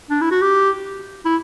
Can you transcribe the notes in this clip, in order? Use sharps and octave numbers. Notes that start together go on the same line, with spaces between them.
D4
E4
F#4
G4
E4